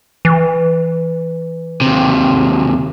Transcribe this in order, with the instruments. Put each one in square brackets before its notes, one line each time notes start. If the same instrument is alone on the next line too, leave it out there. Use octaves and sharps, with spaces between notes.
[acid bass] E3
[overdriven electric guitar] D#2 C3